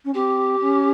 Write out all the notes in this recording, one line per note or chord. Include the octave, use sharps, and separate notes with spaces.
C#4
C4 G4
C#4